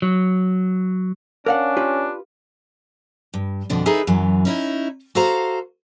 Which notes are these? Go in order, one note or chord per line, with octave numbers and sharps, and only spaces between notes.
F#3
C#4 D4 A#4 F5 F#5
F4 G4 B4
G2
F2 B2 D3 D4
D#4 E4 G#4 A4 B4
F#2 E3 F#3
C#4 D#4 E4
F#4 A4 C5 F5 A#5